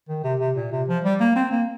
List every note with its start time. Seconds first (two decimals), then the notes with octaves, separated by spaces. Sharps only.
0.09 D#3
0.24 C3
0.40 C3
0.56 A#2
0.72 C3
0.88 F3
1.04 G3
1.20 A#3
1.36 C4
1.51 A#3